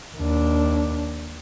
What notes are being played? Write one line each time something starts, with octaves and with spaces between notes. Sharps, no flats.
D#2 D4